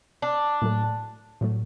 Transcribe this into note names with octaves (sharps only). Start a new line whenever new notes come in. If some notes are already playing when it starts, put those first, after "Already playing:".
D4
A2 F#3 A3
A2 F#3 A3